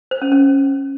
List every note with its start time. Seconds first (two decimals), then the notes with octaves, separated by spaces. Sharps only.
0.11 C5
0.22 C#4
0.32 C#4